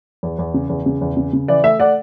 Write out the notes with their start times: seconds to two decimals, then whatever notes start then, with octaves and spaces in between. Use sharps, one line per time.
0.23 E2
0.39 E2
0.54 C#3
0.70 E2
0.86 C#3
1.01 E2
1.17 C#3
1.33 C#3
1.48 E3 D5
1.64 A3 E5
1.80 A3 D5 F#5